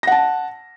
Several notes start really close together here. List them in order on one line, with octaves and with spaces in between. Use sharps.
A#6 F#5 A5